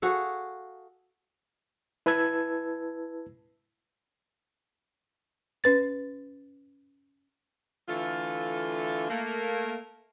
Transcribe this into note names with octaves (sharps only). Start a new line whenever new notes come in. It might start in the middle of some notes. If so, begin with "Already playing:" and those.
F#4 G#4 A4 F5
E4 B4 A5 E6 G#6
C#4 B4 A6
D3 E3 A3 F4
A3 A#3